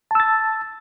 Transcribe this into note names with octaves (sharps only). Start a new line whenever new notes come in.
A5 E6 A6